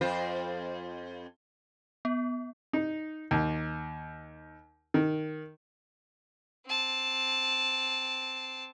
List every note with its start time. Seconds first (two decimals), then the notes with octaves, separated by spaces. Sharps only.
0.01 F2 F4 C5
2.05 B3
2.73 D#4
3.31 D#2
4.94 D#3
6.66 C4 A5